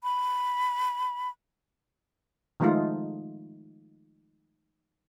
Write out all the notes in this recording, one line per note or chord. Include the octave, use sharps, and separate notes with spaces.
B5
D#3 F3 G#3 A3 D#4 F4